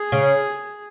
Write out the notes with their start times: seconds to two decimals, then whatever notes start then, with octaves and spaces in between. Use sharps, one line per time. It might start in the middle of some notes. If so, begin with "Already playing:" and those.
Already playing: G#4
0.12 C#3